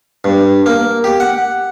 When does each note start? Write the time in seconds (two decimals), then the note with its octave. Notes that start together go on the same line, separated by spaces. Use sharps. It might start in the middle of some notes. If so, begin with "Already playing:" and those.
0.24 G2
0.66 A#3
1.04 G4
1.20 F#5